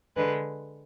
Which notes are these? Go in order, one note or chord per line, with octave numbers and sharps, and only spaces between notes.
D3 G#3 B4